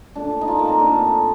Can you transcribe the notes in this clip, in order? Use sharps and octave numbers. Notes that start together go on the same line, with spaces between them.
A#2 A3 D4
D#4
F4
A#3
C4
A#2 A3 D4